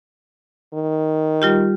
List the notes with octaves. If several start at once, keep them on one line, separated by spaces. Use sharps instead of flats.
D#3
G3 F4 G4